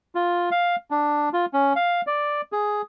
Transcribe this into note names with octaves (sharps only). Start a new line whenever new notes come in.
F4
F5
D4
F4
C#4
F5
D5
G#4